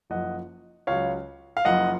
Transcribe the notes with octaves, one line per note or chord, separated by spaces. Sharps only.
F#1 F#2 F3 D#5 F#5
C#2 C#3 F#3 C#5 F5
F5
F#1 F#2 F3 D#5 F#5